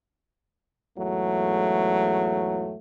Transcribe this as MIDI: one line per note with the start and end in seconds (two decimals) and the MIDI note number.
0.97 2.76 40
0.97 2.76 44
0.97 2.76 54
0.97 2.76 57